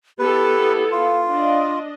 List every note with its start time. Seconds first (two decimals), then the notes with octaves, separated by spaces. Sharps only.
0.19 B3 E4 G4 A4 B4
0.92 F4 F5
1.29 D4 D#5